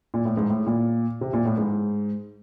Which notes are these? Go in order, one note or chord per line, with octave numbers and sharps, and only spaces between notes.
A#2
A2
G#2
A2
A#2
C3
A#2
A2
G#2